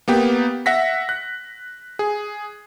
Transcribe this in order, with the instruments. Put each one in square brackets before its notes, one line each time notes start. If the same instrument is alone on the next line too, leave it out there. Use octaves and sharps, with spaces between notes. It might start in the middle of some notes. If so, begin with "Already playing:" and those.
[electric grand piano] A#3 B3 G4
E5 F#5 A#6 B6
F#6
G#4